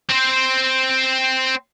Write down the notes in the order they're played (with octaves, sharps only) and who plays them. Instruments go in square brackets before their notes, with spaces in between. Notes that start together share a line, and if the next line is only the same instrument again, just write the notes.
[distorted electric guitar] C4 C5